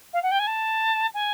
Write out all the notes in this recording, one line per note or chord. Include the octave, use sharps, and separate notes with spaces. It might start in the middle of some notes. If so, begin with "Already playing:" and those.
F5
F#5
G5
G#5
A5
G#5